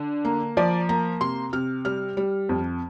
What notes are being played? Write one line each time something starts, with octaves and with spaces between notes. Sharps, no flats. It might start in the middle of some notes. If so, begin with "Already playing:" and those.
Already playing: D3
A#3
F3 D5
A#3 A#5
C3 C6
C3 F6
G3 F6
G3
F2